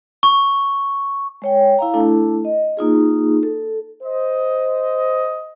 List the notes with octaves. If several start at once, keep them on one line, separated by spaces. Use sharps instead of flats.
C#6
G#3 C#5 G5
E4 F5 A#5
A3 D4 E4 A4
D#5
A#3 D#4 F4 G#4
A4
C5 D#5